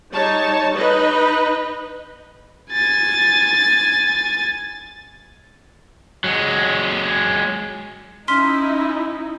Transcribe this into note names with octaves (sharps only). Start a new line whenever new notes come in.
G3 D#4 C#5 A5
D#4 B4 D#5
G#5 A6
F#3 G#3
C#4 D#4 E4 C6 F6 B6